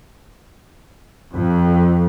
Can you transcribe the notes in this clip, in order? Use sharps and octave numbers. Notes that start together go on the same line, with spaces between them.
F2